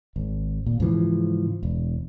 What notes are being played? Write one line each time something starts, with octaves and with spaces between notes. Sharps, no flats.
G#1
A#2
G#2 C#3 E3 F3
E1